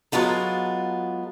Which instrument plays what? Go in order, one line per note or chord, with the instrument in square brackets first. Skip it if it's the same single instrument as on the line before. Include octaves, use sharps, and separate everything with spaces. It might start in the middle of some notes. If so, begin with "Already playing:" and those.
[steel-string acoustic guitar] F#3 G#3 B3 F4 A4